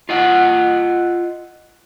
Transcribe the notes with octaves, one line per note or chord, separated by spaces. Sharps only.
F4 D#5 F#5